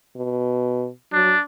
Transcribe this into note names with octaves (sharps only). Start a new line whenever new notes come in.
B2
F#3 D4